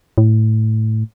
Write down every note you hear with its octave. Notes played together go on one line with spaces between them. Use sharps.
A2